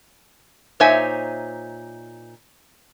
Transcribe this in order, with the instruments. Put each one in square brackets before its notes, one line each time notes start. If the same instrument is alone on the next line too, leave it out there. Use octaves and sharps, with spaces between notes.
[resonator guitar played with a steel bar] A#2 D#4 C5 C#5 E5 G#5